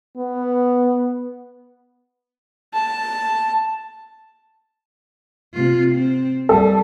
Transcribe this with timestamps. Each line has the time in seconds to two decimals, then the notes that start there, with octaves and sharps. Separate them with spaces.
0.17 B3
2.74 A5
5.54 C3 F4
5.95 C4
6.49 G3 A4